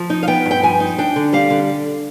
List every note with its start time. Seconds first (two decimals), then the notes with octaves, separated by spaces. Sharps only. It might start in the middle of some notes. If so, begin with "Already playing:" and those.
Already playing: F3
0.10 D#4
0.23 F5
0.27 B3 G5
0.46 G2
0.51 G5
0.63 F3 G#5
0.80 D#4
0.98 D4 G5
1.16 D3
1.33 G3 F5
1.51 D3